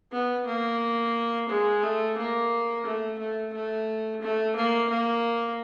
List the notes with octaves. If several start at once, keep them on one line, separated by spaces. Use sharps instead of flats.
B3
A#3
G#3
A3
A#3
A3
A3
A3
A3
A#3
A#3